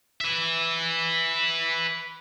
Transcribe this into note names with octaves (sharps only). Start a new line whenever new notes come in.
B4 E5